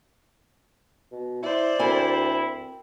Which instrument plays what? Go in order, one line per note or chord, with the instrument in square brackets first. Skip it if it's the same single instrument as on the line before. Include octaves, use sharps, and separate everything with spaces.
[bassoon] B2
[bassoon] E4 [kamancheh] C5 D5
[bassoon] D2 [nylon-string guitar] C4 A#4 G#5 [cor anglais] E4